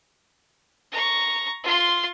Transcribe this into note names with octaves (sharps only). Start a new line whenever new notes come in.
A#5 C#6
F4 C6